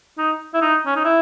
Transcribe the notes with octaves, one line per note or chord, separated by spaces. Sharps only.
D#4
E4
D#4
C#4
D#4
E4